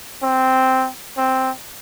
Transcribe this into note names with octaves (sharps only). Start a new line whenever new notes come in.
C4
C4